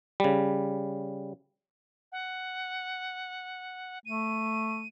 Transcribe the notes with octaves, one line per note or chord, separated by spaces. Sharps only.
C#3 G3
F#5
A3 D#7